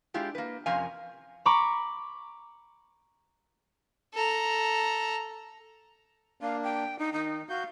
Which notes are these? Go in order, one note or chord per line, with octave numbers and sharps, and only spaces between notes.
G#3 D4 E4 F4 G4
A#3 B4
F2 C3 C#4 A#4 F5 G#5
A#5 B5 C#6 D6
A4 A#5
A#3 D4 F5
G5
D#4
D#3 D#4
F#4 F5 G6